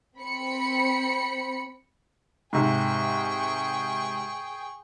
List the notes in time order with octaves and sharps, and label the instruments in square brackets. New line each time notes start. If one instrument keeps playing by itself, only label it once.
[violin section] C4 B5 C#7
[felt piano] G#2 C3 [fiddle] G#4 G5 [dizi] C#6